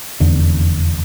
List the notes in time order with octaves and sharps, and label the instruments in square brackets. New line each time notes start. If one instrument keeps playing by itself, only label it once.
[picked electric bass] F1 E2 D3